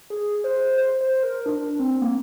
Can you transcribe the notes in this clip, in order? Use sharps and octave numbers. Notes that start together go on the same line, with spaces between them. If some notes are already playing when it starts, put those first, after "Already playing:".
G#4
C5
C5
C5
A#4
D4
C4
A#3